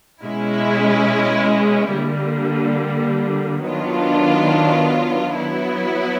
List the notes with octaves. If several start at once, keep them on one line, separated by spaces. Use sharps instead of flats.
B2 G#3 C#4 E4
D3 G3 A#3
D#3 F#3 B3 D4 F4
F#3 B3 E4